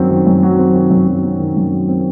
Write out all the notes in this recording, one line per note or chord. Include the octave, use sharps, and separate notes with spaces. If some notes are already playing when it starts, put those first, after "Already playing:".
Already playing: F#2 D#3 F#3 C4
D#3
F#2
F#3
C4
D#3
F#2
F#3
C4
D#3
F#2
F#3
C4